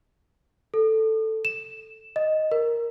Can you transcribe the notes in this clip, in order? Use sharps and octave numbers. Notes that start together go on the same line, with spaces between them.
A4
E7
D#5
A#4